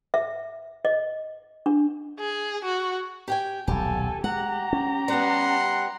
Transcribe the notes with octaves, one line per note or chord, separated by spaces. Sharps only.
E5
D#5
D4
G#4
F#4
G4 G5 G#5
D#1 B1 G4 A4 G#5
G#3 G4 F#5 A#5
C#4
G3 B3 F#5 C6